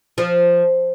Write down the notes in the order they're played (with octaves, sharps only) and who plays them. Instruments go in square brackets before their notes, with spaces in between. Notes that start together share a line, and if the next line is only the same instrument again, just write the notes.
[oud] F3